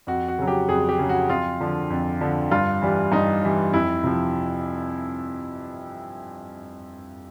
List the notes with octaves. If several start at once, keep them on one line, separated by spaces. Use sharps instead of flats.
F2 F#4
F#4
C#3 F#3
G4
F2 G#4
G4
C#3 F#3
F#4
F2 F4
D3 F3
F2
D3 F3
G2 F4
E3 G3
G2 D#4
E3 G3
F2 E4
C3 F3